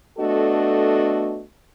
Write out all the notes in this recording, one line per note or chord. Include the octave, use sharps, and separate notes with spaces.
A3 B3 D4 F#4 A4 D#5